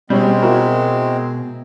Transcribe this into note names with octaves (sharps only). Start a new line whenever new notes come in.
B2 G3 G#3 C4 C#4
E4 F#4 A#4